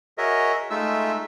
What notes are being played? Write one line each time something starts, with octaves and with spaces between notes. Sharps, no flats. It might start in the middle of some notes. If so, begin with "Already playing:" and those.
F#4 G#4 A#4 C#5 D#5 E5
G#3 A3 D#4 F4 E5 E6